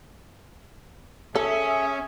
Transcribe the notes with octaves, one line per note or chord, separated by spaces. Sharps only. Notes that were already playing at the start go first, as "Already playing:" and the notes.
C#4 G#4 A4 E5